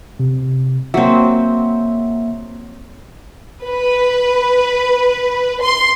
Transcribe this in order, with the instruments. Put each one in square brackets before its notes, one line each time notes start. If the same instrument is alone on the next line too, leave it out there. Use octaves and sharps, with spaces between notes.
[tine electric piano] C3
[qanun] F#3 C4 [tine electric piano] A#3 E5
[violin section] B4
C6